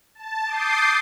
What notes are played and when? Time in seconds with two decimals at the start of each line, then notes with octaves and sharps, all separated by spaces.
0.15 A5
0.45 D6 D#6 G6 A6 C7